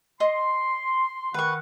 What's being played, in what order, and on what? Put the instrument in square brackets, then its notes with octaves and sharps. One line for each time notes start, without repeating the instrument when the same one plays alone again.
[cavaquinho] D#5 [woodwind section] C6
[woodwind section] D#3 F#5 [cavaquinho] B4 C#6